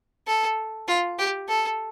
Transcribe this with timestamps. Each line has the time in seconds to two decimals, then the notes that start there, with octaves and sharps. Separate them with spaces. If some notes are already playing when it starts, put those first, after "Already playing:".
0.27 A4
0.88 F4
1.19 G4
1.48 A4